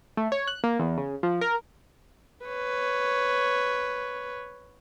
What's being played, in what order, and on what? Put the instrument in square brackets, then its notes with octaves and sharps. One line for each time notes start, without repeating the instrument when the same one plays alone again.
[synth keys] A3
C#5
F#6
A#3
E2
C#3
F3
A#4
[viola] B4 C#5